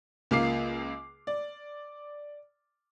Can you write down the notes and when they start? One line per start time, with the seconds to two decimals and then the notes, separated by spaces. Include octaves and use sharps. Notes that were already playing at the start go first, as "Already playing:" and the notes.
0.31 C#2 A#3 F4 D6 C7
1.27 D5